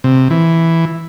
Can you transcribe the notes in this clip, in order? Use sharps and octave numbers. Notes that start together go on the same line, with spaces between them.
C3
E3